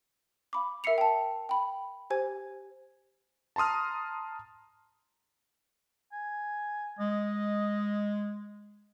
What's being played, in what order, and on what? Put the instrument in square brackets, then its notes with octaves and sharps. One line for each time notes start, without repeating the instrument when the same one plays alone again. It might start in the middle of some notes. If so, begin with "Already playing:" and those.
[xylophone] F5 B5 D6
A#4 E5 E6 C7 C#7 F7
G5 A5
G5 B5
G4 C5 G#5 G#6
[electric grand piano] A5 A#5 C6 D#6 F6
[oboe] G#5
[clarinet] G#3 [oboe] D#5